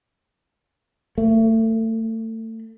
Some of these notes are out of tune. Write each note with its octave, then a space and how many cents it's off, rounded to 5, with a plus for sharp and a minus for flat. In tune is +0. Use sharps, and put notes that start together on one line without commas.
A3 +30